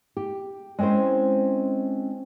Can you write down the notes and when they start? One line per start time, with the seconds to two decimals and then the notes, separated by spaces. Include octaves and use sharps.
0.17 G4
0.79 G#3 C4 C#4 E4 C5